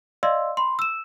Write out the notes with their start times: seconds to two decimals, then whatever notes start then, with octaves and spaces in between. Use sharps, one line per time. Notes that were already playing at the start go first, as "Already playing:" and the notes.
0.23 D5 D#5 F5 C6 E6
0.57 B5 C6
0.79 E6 E7